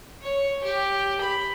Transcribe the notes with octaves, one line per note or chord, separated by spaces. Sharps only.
C#5
G4
B5